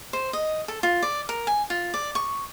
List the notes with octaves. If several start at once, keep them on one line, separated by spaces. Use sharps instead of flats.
C5
D#5
A4
F4
D5
A#4
G#5
F4
D5
C#6